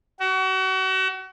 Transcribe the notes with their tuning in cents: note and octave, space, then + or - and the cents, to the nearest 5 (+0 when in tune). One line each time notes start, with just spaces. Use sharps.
F#4 +35